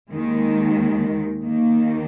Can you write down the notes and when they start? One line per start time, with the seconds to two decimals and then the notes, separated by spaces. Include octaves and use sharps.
0.11 D#2 D#3 G#3
1.43 D#2 D#3 A#3